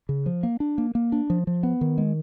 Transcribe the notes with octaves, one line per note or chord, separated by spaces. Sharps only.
C#3
F3
A#3
D4
A#3
A#3
D4
F3
F3
B3
D#3
G#3